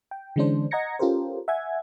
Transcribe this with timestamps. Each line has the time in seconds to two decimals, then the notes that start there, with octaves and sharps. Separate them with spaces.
0.11 G5
0.36 D3 E3 G#3 C#4 D4 C5
0.71 D#5 F#5 A#5 G#6 A#6 C#7
0.99 C#4 F4 G4 A4 A#4 C5
1.48 E5 F#5 G#5 G#6